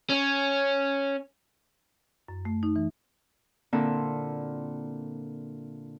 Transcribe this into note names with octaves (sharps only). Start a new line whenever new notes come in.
C#4
F#2
A3
D#4
E3
A#2 D3 A#3 C4 E4 F4